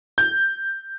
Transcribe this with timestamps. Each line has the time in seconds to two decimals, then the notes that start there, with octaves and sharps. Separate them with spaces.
0.18 G6